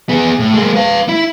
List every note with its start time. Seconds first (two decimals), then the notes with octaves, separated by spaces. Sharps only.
0.09 B3 G#4
0.39 A2
0.54 G#3 A#3
0.76 B4 F5
1.09 E4